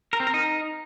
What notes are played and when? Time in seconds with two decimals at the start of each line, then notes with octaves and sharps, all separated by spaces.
0.13 A#4
0.20 C4
0.27 A#4
0.34 D#4